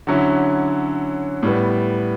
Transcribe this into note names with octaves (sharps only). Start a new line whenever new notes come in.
D3 F#3 C#4 E4
A2 G3 B3